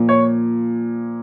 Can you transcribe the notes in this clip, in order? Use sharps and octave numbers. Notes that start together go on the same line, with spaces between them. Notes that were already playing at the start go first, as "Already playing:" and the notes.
Already playing: A#2 F3
C#5